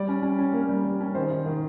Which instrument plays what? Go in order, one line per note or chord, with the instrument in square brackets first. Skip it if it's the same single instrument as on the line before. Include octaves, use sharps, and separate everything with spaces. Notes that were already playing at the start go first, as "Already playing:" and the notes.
Already playing: [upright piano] G3 D5
C#4
C#4
C#4
A#3
G3
G3
C#4
D#3 C5
D#3
D#3